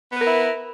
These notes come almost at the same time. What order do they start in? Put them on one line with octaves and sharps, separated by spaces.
B3 B4 A#4 E4